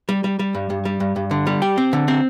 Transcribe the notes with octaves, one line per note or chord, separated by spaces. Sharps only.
G3
G3
G3
G2
G2
G3
G2
G2
D3
G3
G4
C4
D3
C4